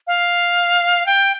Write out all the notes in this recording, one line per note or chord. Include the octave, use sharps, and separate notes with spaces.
F5
G5